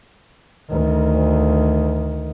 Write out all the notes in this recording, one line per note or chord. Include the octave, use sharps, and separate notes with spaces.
D2 D#3